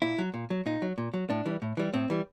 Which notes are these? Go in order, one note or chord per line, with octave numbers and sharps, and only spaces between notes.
A#2 E4
F#3
A#2
F#3
A#2 D#4
F#3
A#2
F#3
A2 D4
E3 G3
A2
E3 G3
A2 C4
E3 G3